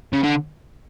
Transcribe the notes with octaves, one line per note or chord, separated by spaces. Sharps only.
C#3
D3